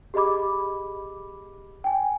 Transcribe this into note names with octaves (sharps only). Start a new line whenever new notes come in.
G4 G#4 D#5 B5 D6
G5 G#5